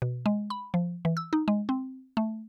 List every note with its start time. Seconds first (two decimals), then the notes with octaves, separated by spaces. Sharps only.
0.02 B2
0.26 G#3
0.50 B5
0.74 F3
1.05 E3
1.17 E6
1.33 D#4
1.48 G#3
1.69 C4
2.17 A3